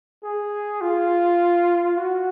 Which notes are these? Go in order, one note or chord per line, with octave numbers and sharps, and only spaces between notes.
G#4
F4
F#4